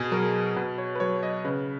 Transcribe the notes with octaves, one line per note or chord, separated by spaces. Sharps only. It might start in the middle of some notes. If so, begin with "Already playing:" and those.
Already playing: B2 G#4
F#3 A#4
B2 B4
C#5
B4
F#3 C#5
D#5
C#3 B4